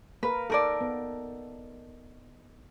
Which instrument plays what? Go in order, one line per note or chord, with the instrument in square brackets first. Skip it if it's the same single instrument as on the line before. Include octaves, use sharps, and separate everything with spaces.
[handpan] A#3 A#4 [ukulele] B4
[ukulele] D#4 A#4 D5 [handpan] A4
[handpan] B3